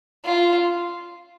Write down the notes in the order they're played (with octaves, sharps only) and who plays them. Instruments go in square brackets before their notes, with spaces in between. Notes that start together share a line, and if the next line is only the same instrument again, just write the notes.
[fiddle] F4